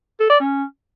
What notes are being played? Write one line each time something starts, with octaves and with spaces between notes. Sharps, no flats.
A4
D5
C#4